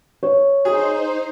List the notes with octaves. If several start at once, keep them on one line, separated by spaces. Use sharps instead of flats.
C#5
D#4 G#4 C5